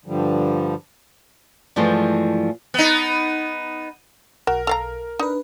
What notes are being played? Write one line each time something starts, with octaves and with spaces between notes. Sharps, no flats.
G2 D3 F3 G3
G2 E3 F3 G#3 A3
B3 D#4
B1 F#4 A#4
A4 F5 A#5
D4 D#4 B4